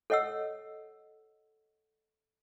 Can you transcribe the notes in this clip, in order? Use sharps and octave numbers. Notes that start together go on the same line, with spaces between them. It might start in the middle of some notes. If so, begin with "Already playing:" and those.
A4 C#5 D#5 F#5 E6